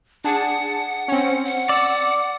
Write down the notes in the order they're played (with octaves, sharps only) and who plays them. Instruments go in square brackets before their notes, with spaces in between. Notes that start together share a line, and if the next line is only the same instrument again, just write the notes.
[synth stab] D4 G#4 A5 [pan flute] F#5
[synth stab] C4 C#4
[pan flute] F#5
[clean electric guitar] D5 [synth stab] E6